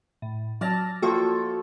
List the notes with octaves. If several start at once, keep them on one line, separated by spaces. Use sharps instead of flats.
A2
F#3 D5 A5 E6 F6 A#6
F3 A3 A#3 F#4 A4 G5